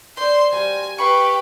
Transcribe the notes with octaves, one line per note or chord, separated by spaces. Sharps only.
C5 D5 C6
G3 F#4 A#4 G#5
G4 B4 F5 B5 C#6